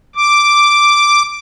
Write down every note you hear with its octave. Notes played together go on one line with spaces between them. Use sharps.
D6